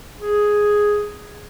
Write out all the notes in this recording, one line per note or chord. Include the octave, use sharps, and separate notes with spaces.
G#4